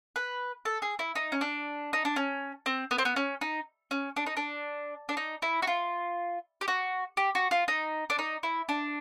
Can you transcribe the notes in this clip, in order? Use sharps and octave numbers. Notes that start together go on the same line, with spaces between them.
B4
A4
G#4
E4
D#4
C#4
D4
D#4
D4
C#4
C4
B3
C4
B3
C#4
D#4
C#4
D4
D#4
D4
D4
D#4
E4
F#4
F4
G4
F#4
G4
F#4
F4
D#4
D4
D#4
E4
D4